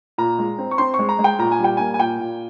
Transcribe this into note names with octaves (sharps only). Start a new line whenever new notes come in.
A#2 A#5
G#3
C4
C#6
C4 C6
C#6
G#3
A#5
G#3
G5
A#2 A#5
G#5
G3
G5
A#3 G#5
G#5
A#2 G5
A#2